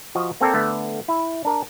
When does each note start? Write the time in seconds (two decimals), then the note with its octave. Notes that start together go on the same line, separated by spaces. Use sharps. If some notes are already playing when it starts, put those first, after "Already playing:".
0.15 F3 F#4 D#5
0.41 A#3 C4 A4 D5 G5 A#5
0.54 D3 A3 B3
1.08 E4
1.45 D4 A#4